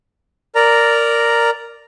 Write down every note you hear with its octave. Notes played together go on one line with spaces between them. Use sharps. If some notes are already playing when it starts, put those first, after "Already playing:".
A#4 D5 A#5